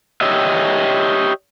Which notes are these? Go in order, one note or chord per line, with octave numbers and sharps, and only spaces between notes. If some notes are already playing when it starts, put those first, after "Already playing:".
G4 C#5 D#5 E5